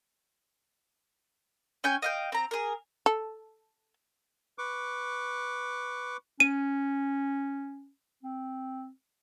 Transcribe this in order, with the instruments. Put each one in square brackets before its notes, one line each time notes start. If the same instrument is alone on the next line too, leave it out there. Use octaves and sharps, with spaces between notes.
[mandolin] C#4 G5 G#5 G6
D#5 F5 G5
C4 A#5
G#4 A#4
[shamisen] A4
[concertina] B4 C#6 D6
[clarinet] C#4 [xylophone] D#7
[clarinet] C4